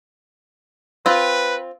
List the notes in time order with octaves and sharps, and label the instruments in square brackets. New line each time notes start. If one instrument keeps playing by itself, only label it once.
[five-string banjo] C4 F4 [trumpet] B4